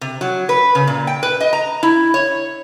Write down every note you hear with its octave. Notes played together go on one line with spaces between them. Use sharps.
C3
F#3
B4
C#3
A#2
G5
B4
D#5
A#5
E4
C#5